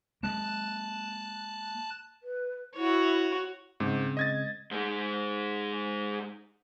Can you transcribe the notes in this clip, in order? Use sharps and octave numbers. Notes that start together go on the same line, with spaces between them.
G#3 A#3 A5 F#6
B4
E4 F#4 C#5
G#2 C#3 G#3 C4
D#5 G#6 A6
G#2 G#3